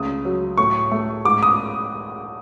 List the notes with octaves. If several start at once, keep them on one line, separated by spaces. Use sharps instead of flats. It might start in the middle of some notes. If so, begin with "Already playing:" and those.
Already playing: C#2 A3 D#6
F#3
A2 C#6
A3
G#2 D6
D#6